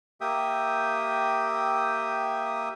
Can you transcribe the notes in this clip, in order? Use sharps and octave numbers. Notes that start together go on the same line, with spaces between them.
A#3 G4 E5 G5 D#6